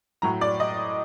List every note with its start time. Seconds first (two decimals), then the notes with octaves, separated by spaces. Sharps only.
0.22 A2 F#3 A#5
0.41 D5
0.60 D#5